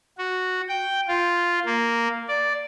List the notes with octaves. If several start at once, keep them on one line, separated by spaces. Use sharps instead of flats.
F#4
G5
F4
A#3
D5